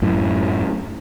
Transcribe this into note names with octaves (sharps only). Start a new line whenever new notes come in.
F#2 A2